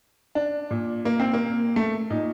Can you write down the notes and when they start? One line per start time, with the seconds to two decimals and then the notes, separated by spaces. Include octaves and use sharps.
0.35 D4
0.71 A#2
1.05 A#3
1.20 C4
1.33 A#3
1.76 A3
2.10 A#2 D#4